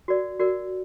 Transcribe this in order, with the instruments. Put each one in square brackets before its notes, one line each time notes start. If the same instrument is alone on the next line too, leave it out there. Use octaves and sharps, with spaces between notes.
[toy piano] F#4 A#4 D5
F#4 A#4 D5